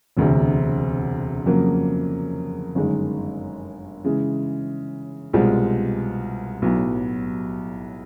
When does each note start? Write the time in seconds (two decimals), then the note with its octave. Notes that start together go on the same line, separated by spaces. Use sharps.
0.17 E1 D2 C3
1.46 F2 C#3 F#3 A#3
2.75 G1 F#2 D#3 G#3
4.04 C#3 E3 G#3
5.33 C2 B2 G#3 C4 F4
6.62 B1 A2 F#3 B3